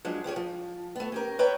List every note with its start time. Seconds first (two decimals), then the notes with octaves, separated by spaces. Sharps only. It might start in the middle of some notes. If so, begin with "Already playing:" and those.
0.05 F3 F#3 G#3 D4
0.24 F4 G4 G#4 C#5
0.36 F3
0.96 A3 B3
1.12 C#4 G4 A#4
1.39 B4 C#5 E5 G5 A#5